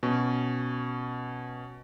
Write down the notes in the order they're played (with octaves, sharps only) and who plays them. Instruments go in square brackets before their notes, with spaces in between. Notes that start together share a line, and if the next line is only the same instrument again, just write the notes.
[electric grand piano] B2 C#4 C#6